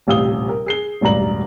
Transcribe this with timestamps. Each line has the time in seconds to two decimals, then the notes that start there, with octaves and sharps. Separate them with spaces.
0.07 D#1 A1 C3 F5 D#6 G7
0.49 A#4
0.66 G#4 C7 G7
1.01 E1 A1 G2 D5 A#5 F#7